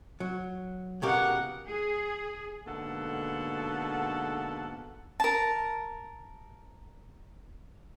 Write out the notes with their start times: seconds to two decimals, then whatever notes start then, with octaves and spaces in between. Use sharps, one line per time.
0.20 F#3
1.02 C#2 B2 G4 A#4 F#5
1.68 G#4
2.66 G#2 B2 D3 A#3 A4 F#5
5.20 A#4 A5